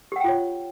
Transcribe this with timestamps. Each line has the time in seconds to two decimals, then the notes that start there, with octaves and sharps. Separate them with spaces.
0.12 G4
0.16 F#5
0.20 G5
0.24 F4
0.28 C#5